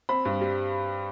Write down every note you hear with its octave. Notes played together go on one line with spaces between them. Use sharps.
C4 B5
G2
G3